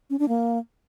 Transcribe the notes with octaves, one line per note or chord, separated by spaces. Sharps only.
C#4
D4
A#3